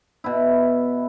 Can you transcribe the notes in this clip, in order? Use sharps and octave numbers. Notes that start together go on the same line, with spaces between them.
B2 E4